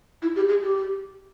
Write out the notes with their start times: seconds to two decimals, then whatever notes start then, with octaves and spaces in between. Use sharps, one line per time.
0.22 E4
0.36 G4
0.49 G#4
0.62 G4